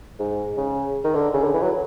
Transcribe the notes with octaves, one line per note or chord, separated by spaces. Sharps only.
G#2
C#3
D#3
D3
C#3
D3
E3
F#3